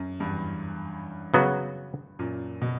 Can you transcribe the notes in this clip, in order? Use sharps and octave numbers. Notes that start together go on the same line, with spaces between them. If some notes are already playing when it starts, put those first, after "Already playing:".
Already playing: F#2
E2 G2
C#3 F#3 B3 F#4
F#2 A#2
B2